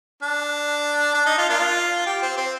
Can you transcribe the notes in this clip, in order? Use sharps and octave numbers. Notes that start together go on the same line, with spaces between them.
D4
D4
D#4
F4
A#3 D4 F4
G4
C4
C4